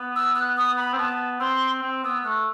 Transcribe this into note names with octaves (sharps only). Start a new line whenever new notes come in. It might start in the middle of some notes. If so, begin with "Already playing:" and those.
Already playing: B3
E6
F#6
D#6
B5
C4
B3 A5
C4 C6
C4
B3 E6
A3 F#6